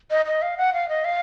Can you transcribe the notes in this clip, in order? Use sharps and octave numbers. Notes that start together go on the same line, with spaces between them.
D#5
D#5
F5
F#5
F5
D#5
F5